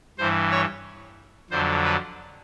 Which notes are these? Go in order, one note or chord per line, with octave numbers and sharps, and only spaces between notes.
G2 E3 C5
C#5
F2 D3 F#3 C5
B4